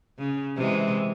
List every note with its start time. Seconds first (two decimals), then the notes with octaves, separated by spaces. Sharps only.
0.18 C#3
0.55 C3 E3 G#3